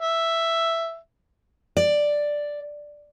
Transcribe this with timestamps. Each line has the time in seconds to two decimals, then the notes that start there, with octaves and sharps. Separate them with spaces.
0.02 E5
1.77 D5